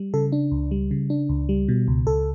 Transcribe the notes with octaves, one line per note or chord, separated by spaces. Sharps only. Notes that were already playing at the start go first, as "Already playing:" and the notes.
Already playing: G3
C#3 A4
D4
C#2
G3
C#3
D4
C#2
G3
B2
C#2
C#2 A4